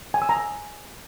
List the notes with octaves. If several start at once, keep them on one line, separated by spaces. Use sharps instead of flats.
G#5
E6
A#5
G#5